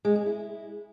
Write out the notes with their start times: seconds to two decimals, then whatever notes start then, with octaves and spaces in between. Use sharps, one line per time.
0.05 G#3
0.15 G#4
0.26 E4